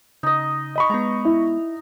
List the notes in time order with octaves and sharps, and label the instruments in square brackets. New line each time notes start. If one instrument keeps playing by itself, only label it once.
[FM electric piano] C#3 [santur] D#4 D#5
[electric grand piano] D#5 B5 C#6
[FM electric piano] G#3 B3 [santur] A#5
[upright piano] E4